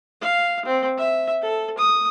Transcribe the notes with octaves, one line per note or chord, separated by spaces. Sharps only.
F5
C4
E5
A4
D#6